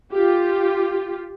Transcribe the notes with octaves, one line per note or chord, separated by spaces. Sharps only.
F4 G4